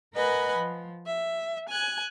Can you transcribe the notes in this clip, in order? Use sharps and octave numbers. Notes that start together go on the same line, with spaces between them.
A#4 B4 D#5 F#5 G#5 B5
F3
E5
G#5 F#6 G#6